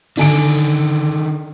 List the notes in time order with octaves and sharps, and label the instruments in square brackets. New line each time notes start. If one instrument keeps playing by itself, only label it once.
[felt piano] D3 G#5 D7 [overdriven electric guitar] D#3 D4